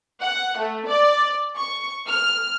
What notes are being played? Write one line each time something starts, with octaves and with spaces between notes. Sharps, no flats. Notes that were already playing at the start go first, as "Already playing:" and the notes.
F#5
A3
D5
C#6
F6